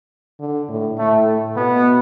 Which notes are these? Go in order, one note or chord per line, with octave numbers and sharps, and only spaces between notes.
D3
A2
A2 A3
B2 B3